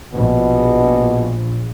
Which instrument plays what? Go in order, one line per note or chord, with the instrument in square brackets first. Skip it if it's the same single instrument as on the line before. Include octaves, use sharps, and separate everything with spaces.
[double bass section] A#1 [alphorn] B2